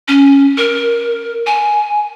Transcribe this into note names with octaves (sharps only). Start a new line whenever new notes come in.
C#4
A#4
G#5